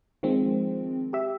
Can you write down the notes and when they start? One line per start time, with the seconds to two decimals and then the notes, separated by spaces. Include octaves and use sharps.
0.23 D#3 F3 G#3 C4
1.13 G4 E5